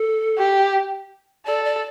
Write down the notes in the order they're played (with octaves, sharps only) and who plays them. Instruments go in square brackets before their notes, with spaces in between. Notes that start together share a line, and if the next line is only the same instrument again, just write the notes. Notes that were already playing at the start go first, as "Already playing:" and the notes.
Already playing: [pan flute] A4
[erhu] G4
[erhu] A4 [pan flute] D5
[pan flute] D5